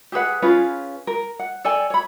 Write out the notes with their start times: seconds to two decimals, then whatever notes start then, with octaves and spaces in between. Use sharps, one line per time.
0.12 G4 G#4 B4 F#5
0.42 C#4 F4 G#4 B4
1.07 A#4
1.39 F#5
1.64 A4 D5 G5 G#5
1.90 C#5 B5